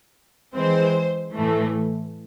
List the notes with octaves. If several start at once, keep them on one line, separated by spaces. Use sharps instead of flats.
E3 G#3 C4 C5
A2 E3 A3